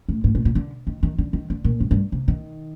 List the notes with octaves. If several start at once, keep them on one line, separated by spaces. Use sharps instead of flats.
A2
A2
A#2
A#2
D3
D#3
D#3
D3
D#3
D3
A#2
G2
G2
C3
D#3